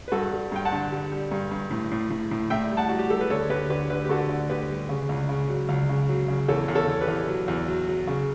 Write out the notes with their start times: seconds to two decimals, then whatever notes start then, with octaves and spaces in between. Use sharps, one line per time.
0.08 B4
0.12 G2 F#4 A4
0.32 G3
0.52 G2 G5
0.65 F#5 A5
0.72 D3
0.92 G3
1.12 G3
1.31 G2
1.51 G2
1.71 A2
1.92 A2
2.10 A2
2.31 A2
2.50 A2 E5 G5
2.71 G3
2.77 F#5 A5
2.89 G3 F#4
2.99 G4
3.10 G3 A4
3.20 B4
3.30 D2 A4 C#5
3.50 D2 G4 B4
3.70 D3 G4 B4
3.90 D2 G4 B4
4.05 G4
4.09 D3 F#4 A4
4.29 D2
4.49 D2 G4 B4
4.70 G3
4.89 C#3
5.09 C#2
5.29 C#3
5.49 F#3
5.69 C#2
5.89 C#3
6.09 F#3
6.28 C#3
6.48 E2 A4 C#5
6.68 E2
6.75 A4 C#5
6.88 E2
7.01 G4 B4
7.08 E2
7.28 F#3
7.48 E2
7.68 F#3
7.88 F#3
8.07 C#3